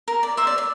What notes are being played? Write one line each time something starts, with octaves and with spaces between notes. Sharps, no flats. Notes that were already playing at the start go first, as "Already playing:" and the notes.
A#4
D5
C5 E5
D5
D5